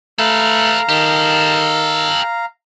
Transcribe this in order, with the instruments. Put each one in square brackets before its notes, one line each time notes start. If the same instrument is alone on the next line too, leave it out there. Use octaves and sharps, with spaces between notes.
[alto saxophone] A3 [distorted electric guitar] A4 B4 [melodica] F5 A#5
[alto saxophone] D#3 [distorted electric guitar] G4 A4